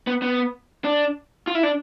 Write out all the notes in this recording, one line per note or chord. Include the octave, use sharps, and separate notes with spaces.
B3
B3
D4
F4
E4
D4